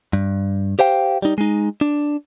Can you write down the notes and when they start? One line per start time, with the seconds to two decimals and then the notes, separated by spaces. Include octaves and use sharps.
0.13 G2
0.79 G4 C5 F5 G5
1.22 G3 D#4
1.38 G#3 D#4
1.81 D4